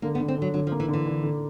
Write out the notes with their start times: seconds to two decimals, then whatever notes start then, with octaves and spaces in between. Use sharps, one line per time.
0.02 D3 A#3
0.15 B3
0.20 D3
0.28 C4
0.38 D3 F#3
0.54 D3 F#3
0.67 F3
0.72 A#3
0.80 E3
0.88 D3
0.93 E3
1.07 D3
1.23 D3